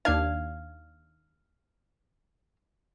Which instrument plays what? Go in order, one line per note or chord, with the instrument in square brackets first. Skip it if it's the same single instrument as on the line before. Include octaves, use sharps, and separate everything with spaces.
[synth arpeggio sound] D#2 D4 G#6 [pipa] F5